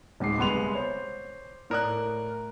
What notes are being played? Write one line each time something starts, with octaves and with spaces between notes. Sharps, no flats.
D1 G#2 D6 C7
C2 G#3 B3 C6 F7
C5 C#5
A2 A#4 D5 D#6 F#6